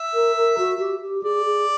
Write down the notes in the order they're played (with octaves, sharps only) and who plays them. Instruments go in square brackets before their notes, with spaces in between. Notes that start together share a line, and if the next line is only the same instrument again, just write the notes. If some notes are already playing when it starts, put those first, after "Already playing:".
Already playing: [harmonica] E5
[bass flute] A#4
A#4
F#4
G4
G4
[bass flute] G#4 [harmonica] D5
[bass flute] G#4